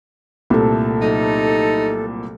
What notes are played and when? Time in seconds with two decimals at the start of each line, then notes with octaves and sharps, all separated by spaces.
0.50 C2 A#2 A3 C4 A4
1.01 F#3 D#4 A4